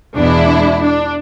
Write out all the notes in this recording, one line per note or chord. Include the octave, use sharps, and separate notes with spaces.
E2 B2 G#3 B3 D4 E4
D4